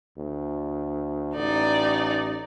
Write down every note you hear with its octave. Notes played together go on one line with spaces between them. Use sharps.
D2
A1 D#4 D5